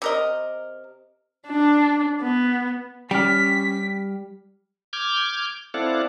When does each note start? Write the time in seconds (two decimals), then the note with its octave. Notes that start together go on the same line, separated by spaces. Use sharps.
0.02 C3 A#4 D#5
1.47 D4
2.22 B3
3.11 G3 C#4 G5 F6 B6
4.93 D6 F6 G6 G#6
5.74 C4 E4 A4 D5 F5 F#5